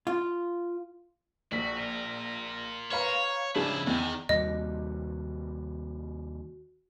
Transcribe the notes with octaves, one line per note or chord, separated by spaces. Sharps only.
F4
A#1 F#4 B6
F4 A#4
B4 C#5 F5 A#5
C#3 F3 D4 E4 G4 G#4
E2 D#3
D#2 C3 G3 F#4 D#5